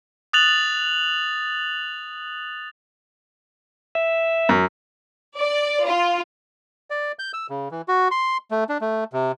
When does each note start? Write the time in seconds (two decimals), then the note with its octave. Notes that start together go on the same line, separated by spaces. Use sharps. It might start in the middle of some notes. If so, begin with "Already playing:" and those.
0.33 D#6 F#6 A6 F7 F#7
3.95 E5
4.49 F#2
5.37 D5
5.86 F4
6.90 D5
7.19 G6
7.34 E6
7.50 C#3
7.71 E3
7.88 F#4
8.11 C6
8.51 A3
8.69 D4
8.81 A3
9.13 C3